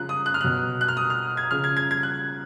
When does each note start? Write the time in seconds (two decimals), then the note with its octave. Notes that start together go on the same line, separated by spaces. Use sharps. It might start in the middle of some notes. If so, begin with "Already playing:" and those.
Already playing: C#3 F3 F#6
0.09 D#6
0.26 F#6
0.34 F6
0.41 B2 F#3 F#6
0.81 F#6
0.88 F6
0.97 D#6
1.10 F6
1.37 G#6
1.51 C#3 F3 F6
1.64 G#6
1.77 G#6
1.91 G#6
2.03 F#6